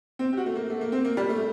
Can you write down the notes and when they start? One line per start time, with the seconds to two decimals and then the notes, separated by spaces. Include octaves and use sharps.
0.19 C4
0.33 G4
0.37 F#4
0.46 A3
0.55 A#3
0.70 A3
0.81 A#3
0.92 C4
1.05 A#3
1.17 G3
1.29 A3